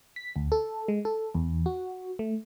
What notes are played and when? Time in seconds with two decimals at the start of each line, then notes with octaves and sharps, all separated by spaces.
0.16 B6
0.36 D2
0.52 A4
0.88 G#3
1.05 A4
1.35 E2
1.66 F#4
2.19 A3